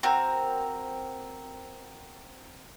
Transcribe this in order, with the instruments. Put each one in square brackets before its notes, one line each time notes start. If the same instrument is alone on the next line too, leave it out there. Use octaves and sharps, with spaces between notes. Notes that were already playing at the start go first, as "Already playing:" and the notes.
[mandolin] C4 F#4 A#4